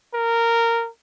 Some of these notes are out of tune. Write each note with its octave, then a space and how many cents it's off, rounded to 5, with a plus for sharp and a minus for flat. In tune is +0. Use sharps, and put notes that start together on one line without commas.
A#4 -10